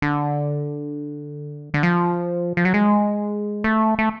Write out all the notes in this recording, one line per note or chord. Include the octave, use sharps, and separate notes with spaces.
D3
D3
F3
F3
F#3
G#3
A3
A3